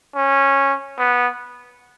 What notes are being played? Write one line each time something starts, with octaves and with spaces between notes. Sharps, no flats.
C#4
B3